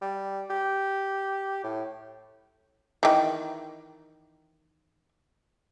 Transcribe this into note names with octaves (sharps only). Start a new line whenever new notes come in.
G3
G4
A2
D#3 E3